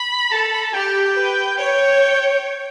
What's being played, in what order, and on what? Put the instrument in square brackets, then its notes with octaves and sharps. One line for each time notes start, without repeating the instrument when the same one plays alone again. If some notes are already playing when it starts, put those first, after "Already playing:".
Already playing: [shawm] B5
[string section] A4 [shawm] A5
[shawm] A5
B5
A5
[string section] G4 [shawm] G5
[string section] B4
[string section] C#5 [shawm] G5